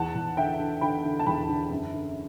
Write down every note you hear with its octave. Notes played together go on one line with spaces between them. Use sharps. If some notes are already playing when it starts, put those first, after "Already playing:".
Already playing: E2 F#5 A5
E2
D3 E5 G5
D3
D3 G5 B5
D3
A5
E2 G5 B5
D3
F#2
D3